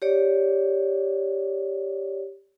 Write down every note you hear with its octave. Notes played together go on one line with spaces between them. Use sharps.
G4 C#5 D5